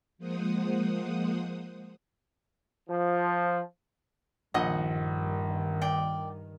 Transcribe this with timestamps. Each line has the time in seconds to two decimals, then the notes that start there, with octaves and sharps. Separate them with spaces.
0.18 F3 G#3 A#3 C5 F#5 D#6
2.88 F3
4.54 A#1 G2 D#3 D#5 F#5 D#6
5.81 D5 G5